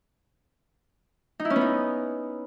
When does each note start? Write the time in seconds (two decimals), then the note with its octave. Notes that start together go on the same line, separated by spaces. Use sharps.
1.40 D#4
1.45 E4
1.50 C#4
1.56 B3
1.61 D#4